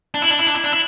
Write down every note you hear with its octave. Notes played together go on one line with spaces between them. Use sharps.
D4
E4
D4
E4
D4
E4
D4
E4